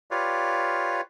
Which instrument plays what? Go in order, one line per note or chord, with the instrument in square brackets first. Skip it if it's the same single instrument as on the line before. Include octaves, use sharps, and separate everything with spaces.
[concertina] F4 G4 B4 C#5 D5 F5